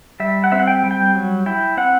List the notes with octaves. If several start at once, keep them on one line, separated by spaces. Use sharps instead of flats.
G3 E5
F#5
C4 E5
F#5
G5
G3
G5
F#3
E4 G5
C4 F#5